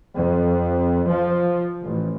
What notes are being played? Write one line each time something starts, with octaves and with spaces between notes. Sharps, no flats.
F2
F3
A1